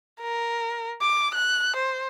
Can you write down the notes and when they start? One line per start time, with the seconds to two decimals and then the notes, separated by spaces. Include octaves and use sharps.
0.22 A#4
1.02 D6
1.35 F#6
1.76 C5